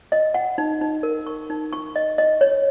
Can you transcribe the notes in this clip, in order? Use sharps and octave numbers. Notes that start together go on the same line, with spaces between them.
D#5
F#5
D#4
D#4
A#4
C#6
D#4
C#6
D#5
D#5
C#5